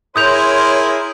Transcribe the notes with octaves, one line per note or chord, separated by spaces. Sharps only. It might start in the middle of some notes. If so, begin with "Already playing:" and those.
E4 G#4 A#4 C#5 C6 D#6 G6 F7